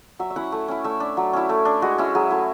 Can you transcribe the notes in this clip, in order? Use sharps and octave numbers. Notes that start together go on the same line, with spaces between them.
F#3 E5
E5
C#4 E4 F#5
A3
C#4 E4
A3 E5
D4
F#3
C#4 E4
A3
D4
G#3 F#4
C#4 E4
F#3 G#4
A3 E4